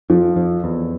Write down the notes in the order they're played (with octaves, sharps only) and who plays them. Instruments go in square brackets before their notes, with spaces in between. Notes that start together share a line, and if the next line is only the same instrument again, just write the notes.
[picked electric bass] F2 [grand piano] F3
[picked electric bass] F2
E2